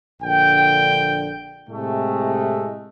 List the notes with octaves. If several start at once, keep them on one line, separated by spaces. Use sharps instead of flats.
A#1 D3 G5
A2 C3 G#3 A3